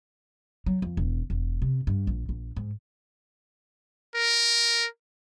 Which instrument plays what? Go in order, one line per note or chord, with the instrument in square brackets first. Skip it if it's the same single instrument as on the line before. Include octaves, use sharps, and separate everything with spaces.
[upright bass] F#3
F2
E1
E1
C3
G2
A#1
A#1
G#2
[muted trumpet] A#4